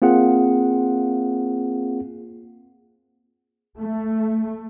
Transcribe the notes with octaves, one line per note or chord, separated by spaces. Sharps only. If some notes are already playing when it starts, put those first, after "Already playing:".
A#3 C4 F4 G#4 F#5
A3